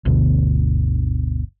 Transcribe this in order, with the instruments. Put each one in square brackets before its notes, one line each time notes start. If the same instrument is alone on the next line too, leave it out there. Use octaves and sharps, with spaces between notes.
[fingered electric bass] G1 D2 B2 D3